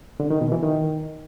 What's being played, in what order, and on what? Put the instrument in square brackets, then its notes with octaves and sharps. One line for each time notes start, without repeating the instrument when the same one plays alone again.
[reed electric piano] D3
D#3
B2
E3
D#3